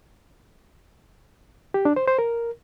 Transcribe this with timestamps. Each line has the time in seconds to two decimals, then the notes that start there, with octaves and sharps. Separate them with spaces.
1.74 G4
1.85 D4
1.96 C5
2.07 C5
2.19 A#4